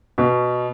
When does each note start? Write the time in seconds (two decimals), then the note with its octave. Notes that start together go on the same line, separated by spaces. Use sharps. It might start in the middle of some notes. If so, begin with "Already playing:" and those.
0.18 B2